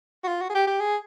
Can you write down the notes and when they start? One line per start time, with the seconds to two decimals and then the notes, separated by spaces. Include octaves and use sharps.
0.24 F#4
0.28 F4
0.41 F#4
0.50 G#4
0.55 G4
0.67 G4
0.80 G#4